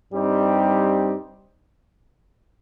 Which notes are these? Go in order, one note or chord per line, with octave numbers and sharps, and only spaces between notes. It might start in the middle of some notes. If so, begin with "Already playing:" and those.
G2 G3 C4 D#4 G4